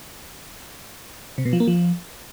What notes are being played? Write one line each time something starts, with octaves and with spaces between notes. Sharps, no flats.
C3
B2
F3
A#3
F3